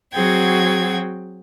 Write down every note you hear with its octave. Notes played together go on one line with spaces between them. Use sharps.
F#3 C4 F#4 G#4 G5 G#6